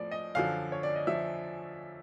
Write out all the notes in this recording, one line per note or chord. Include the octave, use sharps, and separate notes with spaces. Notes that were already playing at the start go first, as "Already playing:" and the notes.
Already playing: A2 F3 D5
D#5
F#2 D3 F3 F5
C#5
D5
D#5
F3 E5